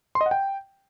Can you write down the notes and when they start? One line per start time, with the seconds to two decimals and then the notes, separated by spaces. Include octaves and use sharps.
0.15 C6
0.21 D#5
0.26 F#5
0.31 G5